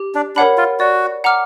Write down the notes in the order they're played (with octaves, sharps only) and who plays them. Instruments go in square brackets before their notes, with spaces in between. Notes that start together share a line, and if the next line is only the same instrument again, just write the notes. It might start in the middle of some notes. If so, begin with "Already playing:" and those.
Already playing: [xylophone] G4
[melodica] D4
[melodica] D4 [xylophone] A#4 C#5 F#5 B5
[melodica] F4
[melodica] F#4 [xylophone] D5
[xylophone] F#5 A#5 D6 F6